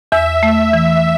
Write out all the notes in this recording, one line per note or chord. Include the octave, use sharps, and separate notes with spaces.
E2 E5
A3
E3